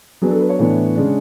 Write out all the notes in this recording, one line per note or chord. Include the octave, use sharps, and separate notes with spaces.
F#3 B3 D4 G#4
A4
B4
C#5
A2 E3 B3 D4
C#3 G#3 D4